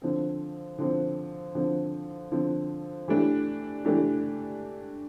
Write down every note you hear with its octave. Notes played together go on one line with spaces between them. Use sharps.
D3 F3 C4
D3 F3 C4
D3 F3 C4
D3 F3 C4
E3 A3 D4 G4
E3 A3 D4 G4